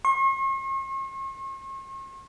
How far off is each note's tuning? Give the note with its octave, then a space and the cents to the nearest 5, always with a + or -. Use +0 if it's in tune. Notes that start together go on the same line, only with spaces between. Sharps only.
C#6 -45